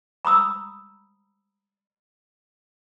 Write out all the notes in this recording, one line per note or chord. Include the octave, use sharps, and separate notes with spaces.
A#5 B5 D#6 E6